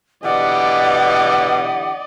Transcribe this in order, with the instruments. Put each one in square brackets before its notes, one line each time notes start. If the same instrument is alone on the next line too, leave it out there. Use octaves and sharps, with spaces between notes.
[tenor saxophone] B2 [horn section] D3 E3 G4 [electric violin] D5 D#5 [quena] F#5